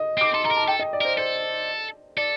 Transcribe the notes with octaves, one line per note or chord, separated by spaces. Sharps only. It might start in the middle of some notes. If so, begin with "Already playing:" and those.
Already playing: D#5
C4 D6
A4 C6
A4 A#5
A#4
A5
A4 G5
D#5
D5
A#4 C5
A4 C5
A4 D5